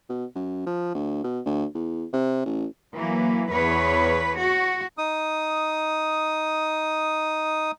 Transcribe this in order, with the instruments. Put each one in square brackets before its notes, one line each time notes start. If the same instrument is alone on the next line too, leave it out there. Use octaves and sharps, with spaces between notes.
[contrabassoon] B2
F#2
F3
D2
B2
D2
E2
C3
A1
[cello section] E3 F#3 A#3
E2 B4 C#5
F#4
[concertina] D#4 D#6